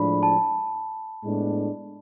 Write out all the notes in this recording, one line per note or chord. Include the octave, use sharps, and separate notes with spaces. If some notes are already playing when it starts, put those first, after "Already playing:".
Already playing: A2 F3 G#3 D4 B5
A5
A2 G#3 B3 D4